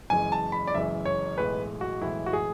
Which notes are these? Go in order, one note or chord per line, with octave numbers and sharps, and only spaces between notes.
F#1 F#2 E3 G#3 G#5
A5
B5
D5
F#1 F#2 E3 G#3 E5
C#5
B1 A2 E3 G#3 B4
F#4
B1 A2 E3 G#3 E4
F#4
G#4